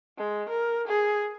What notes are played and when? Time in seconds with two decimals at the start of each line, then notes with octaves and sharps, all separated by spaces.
0.18 G#3
0.49 A#4
0.88 G#4